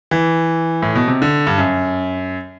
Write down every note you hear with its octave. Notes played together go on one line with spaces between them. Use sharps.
E3
A2
B2
C3
D3
G2
F#2